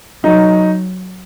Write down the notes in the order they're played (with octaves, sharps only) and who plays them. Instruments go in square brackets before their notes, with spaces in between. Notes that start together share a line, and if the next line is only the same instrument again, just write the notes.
[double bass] F#3 [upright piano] D#4